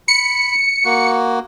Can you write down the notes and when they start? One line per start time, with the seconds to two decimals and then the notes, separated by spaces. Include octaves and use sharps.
0.08 B5 C#7
0.85 A#3 F#4